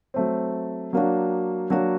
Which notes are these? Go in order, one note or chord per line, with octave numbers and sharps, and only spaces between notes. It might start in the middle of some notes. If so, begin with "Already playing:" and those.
F#3 A3 C4
F#3 A#3 D4 F#4
F#3 A#3 D4 F#4